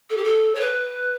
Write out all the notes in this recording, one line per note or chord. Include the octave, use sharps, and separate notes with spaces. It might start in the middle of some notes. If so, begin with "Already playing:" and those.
A4
G4
A4
C#5
B4